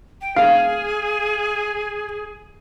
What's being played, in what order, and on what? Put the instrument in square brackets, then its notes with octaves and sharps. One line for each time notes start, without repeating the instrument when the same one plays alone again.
[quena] G5
[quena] G#4 [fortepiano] F5